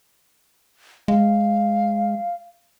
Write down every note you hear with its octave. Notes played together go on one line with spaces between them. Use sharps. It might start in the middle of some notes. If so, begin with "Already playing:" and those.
G#3 F5